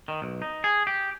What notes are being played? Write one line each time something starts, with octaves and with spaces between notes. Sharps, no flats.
D#3
B1
D#4
G#4
G4